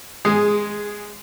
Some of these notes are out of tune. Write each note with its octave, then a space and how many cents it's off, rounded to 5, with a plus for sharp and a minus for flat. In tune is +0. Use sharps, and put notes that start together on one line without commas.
G#3 +0 G#4 -10